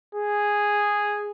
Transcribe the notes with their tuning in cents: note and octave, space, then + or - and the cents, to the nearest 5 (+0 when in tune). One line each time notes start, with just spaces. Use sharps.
G#4 -5